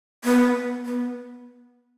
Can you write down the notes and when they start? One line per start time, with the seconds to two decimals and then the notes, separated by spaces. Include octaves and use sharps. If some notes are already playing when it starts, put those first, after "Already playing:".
0.24 B3
0.85 B3